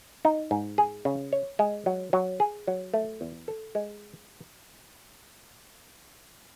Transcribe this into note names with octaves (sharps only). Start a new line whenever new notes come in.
D#4
G#2
G#4
C#3
C#5
G#3
F#3
F#3
G#4
F#3
A3
E2
A4
G#3